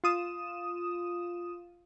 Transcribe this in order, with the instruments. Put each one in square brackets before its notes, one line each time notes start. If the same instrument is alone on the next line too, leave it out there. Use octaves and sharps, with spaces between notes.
[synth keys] F4 D#6 E7